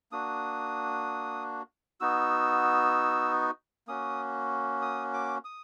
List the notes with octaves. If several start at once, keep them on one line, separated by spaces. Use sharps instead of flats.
A#3 D4 F#4 D#6
B3 D#4 F#4 E6
A#3 C#4 F#4 D#6
D#6
D6
D#6